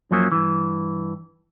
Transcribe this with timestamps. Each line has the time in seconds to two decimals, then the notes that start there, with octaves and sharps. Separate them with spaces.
0.11 F#2 F3 F#3 A#3 C#4
0.32 G2 E3